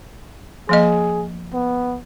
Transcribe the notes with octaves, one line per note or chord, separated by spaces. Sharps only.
F3 A#3 G#4 D#5
B3